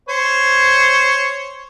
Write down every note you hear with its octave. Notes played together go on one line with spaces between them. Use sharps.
C5 C#5